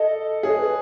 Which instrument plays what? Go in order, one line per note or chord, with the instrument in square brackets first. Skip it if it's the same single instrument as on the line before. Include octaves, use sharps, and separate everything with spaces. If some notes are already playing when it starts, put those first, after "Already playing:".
Already playing: [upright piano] A4 [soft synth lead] D#5
[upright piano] G#4 [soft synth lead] C#5
[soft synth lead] B4